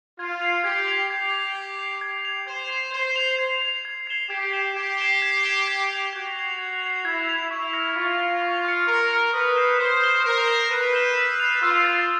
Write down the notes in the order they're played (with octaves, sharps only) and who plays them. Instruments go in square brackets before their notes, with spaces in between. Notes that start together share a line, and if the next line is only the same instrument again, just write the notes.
[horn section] F4 [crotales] G#6
[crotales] C7 F7
[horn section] G4 [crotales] G#6
[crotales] C7 F7
[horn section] G4 [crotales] G#6
[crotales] C7 F7
G#6
C7 F7
G#6
C7 F7
[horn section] C5 [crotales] G#6
[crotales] C7 F7
[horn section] C5 [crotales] G#6
[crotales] C7 F7
G#6
C7 F7
G#6
C7 E7 G7
[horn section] G4 [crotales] G#6
[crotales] C7 E7 G7
[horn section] G4 [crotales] G#6
[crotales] C7 E7 G7
G#6
C7 E7 G7
G#6
C7 F7
[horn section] F#4 [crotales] G#6
[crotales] C7 F7
G#6
C7 F7
[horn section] E4 [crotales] G#6
[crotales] C7 F7
[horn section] E4 [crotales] C#6
[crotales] F6 A#6 C#7
[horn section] F4 [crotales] C#6
[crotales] F6 A#6 C#7
C#6
F6 A#6 C#7
[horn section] A#4 [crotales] C#6
[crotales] F6 A#6 C#7
[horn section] B4 [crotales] D#6
[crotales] G6 C7 E7 G7
[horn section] C5 [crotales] D#6
[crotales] G6 C7 E7 G7
[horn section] A#4 [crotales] D#6
[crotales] G6 C7 E7 G7
[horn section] B4 [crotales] D#6
[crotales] G6 C7 E7 G7
E6
A6 C7 F7
[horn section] F4 [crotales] E6
[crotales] A6 C7 F7